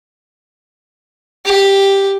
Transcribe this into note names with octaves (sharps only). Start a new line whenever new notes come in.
G4